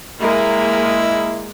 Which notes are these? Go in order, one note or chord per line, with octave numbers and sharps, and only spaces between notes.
G#3 A#3 E4